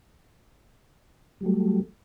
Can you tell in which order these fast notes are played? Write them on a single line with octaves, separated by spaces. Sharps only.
G3 F#3 A3